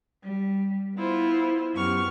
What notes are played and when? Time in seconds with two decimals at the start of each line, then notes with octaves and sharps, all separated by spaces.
0.24 G3
0.97 B3 E4 F4 C5
1.73 F#2 B3 G4 C#6 F6